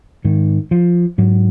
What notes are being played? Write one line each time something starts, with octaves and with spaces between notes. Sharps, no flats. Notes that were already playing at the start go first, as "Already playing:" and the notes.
G#2 D#3
F3
G#2 F#3